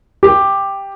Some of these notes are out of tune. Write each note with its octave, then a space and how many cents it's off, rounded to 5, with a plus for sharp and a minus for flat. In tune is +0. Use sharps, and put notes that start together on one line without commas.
G4 +5